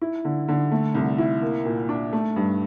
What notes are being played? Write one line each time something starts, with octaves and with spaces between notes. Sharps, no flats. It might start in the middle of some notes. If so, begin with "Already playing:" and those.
E4
D3
D3
A3
C2
E4
A#3
A#2
D4
A3
G2